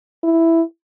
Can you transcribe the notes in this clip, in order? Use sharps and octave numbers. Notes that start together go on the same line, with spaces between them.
E4